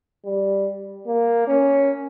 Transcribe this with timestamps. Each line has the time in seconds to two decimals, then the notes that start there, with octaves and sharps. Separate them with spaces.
0.25 G3
1.07 A#3
1.47 C#4